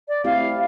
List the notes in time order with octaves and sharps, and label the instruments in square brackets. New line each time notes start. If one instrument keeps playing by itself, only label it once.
[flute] D5
[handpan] A3 C4 E4 G4 [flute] F5